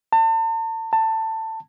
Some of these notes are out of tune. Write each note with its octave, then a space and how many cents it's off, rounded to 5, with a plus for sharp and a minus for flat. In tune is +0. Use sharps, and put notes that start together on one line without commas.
A5 +40
A5 +20